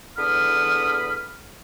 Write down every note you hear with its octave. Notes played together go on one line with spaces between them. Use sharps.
E2 D3 B5 D#6 F6